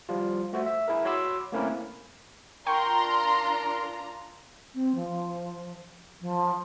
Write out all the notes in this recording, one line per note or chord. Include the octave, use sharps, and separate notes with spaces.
F3 G3 F4
A3 F#4 C5 E5
E5
E4 G#4 A#4
F#4 C#5 B5 C6 D6 E6
A3 A#3 C4 C#4 E4 A#4
D4 F4 A#4 G5 A#5 C6 C#6
C4
F3
F3